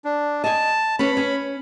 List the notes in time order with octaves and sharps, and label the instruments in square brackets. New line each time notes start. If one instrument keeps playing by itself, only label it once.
[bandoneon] D4
[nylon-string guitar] D#5 G#5 [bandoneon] A5
[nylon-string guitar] C#4 B4 [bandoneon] B5
[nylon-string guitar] C#4